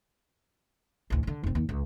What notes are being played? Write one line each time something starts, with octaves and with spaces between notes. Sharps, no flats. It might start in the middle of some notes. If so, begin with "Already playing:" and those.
A1 D2
D3 D#3
F1 C4
D#2
C#2